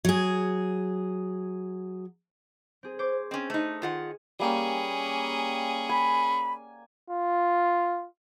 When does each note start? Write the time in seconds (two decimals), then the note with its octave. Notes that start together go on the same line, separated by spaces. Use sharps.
0.05 F#3 G#4
2.83 C4 G#4
2.99 C5 C#5 D6
3.31 C4 C#4 D#5
3.50 A3 D#4
3.82 D#3 F4 G#4 F#5
4.40 G3 A#3 C#4 G#4 G5
5.89 G#5 B5
7.10 F4